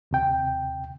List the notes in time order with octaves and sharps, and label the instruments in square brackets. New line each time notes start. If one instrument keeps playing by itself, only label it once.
[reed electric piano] D#2 C3 G5